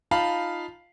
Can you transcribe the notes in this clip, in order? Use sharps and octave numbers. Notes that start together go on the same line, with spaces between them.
D#4 F4 F5 A5 B5